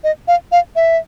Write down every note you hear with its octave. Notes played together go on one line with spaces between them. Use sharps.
D#5
F5
F5
E5